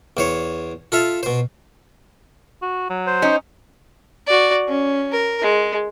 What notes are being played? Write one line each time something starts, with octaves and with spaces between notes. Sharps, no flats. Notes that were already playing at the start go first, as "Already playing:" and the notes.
E2 C5 C#5
F4 A4 E5 F5
B2 C5
F#4
F#3
C5
C#4 D#4
F#4 D5
C#4
A#4
G#3